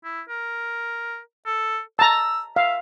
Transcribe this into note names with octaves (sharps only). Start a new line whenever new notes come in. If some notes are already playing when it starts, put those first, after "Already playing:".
E4
A#4
A4
A5 A#5 E6
E5 F5